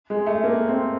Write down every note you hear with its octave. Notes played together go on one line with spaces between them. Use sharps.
G#3
A3
A#3
C4